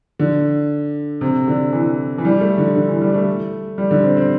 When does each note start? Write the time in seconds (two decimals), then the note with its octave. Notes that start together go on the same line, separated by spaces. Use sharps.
0.19 D3
1.21 C3
1.48 D3
1.73 E3
2.18 E3
2.25 G3
2.41 A3
2.58 D3
2.76 D3
2.88 E3
3.01 G3
3.14 A3
3.78 G3
3.91 D3
4.04 C4
4.17 C4